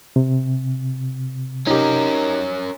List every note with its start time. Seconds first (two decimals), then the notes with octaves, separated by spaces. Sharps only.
0.16 C3
1.67 C#4 D#4 G4 A#4